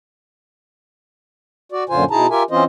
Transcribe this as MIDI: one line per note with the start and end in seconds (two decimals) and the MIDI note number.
1.72 1.84 66
1.72 1.84 74
1.89 2.04 42
1.89 2.04 46
1.89 2.04 50
1.89 2.04 65
1.89 2.04 72
1.89 2.04 80
2.11 2.27 47
2.11 2.27 63
2.11 2.27 64
2.11 2.27 68
2.11 2.27 81
2.11 2.27 82
2.30 2.43 65
2.30 2.43 67
2.30 2.43 70
2.30 2.43 76
2.30 2.43 80
2.51 2.64 52
2.51 2.64 60
2.51 2.64 61
2.51 2.64 65
2.51 2.64 72
2.51 2.64 75